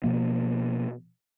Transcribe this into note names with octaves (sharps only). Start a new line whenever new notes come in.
B2 F3 A#3